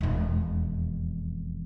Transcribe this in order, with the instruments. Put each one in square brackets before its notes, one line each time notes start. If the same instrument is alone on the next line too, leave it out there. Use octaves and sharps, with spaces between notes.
[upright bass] E1 F2